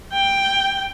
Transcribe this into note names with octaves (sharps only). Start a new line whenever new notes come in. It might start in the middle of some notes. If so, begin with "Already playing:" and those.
G5